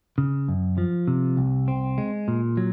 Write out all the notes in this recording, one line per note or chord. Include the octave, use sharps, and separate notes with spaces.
C#3
F#2
F3
C3
C2
C4
G#3
A#2
F#3